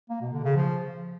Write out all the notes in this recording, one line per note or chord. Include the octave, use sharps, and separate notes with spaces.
A#3
B2
D3
C#3
F3